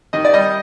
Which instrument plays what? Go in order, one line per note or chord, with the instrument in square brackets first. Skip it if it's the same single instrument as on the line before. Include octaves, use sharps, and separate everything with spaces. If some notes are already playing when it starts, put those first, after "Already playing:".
[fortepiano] D#3 D#5
D5
G3 D#5